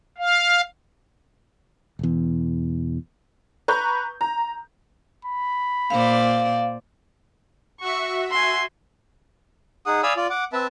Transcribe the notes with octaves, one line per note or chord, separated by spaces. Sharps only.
F5
E1 E2
B4 A#5 C#6 G6
A#5
B5
A#2 C5 D5 F5
F#4 E5 C#6
G#5 C6
D#4 G#4 F#5 D#6
D5 F5 G#5 B5 D#6 E6
F4 D5
F#5 D6
C4 B4 E5 A5